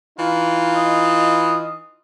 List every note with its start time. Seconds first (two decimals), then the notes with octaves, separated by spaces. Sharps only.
0.18 E3 D#4 F4
0.75 D#5